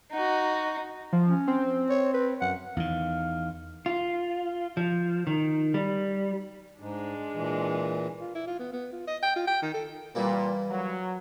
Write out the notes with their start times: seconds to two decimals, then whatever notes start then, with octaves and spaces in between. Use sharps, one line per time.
0.11 D#4 F#4
1.13 F3
1.28 C#4
1.48 C4
1.89 C#5
2.14 B4
2.41 F#2 F#5
2.77 E2 D#3 F5
3.86 F4
4.77 F3
5.27 D#3
5.74 G3
6.80 G#2 G#3 D4
7.35 A#2 E3
8.20 F4
8.35 E4
8.47 F4
8.59 B3
8.73 B3
8.92 F4
9.07 D#5
9.23 G5
9.36 F4
9.47 G5
9.62 D#3
9.74 A4
10.15 A#2 E3 G3 A#3
10.70 F#3